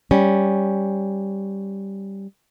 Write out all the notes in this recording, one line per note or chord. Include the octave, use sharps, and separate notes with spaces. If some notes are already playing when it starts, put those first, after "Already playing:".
G3 C#4